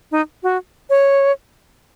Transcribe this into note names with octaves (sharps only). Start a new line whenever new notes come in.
D#4
F#4
C#5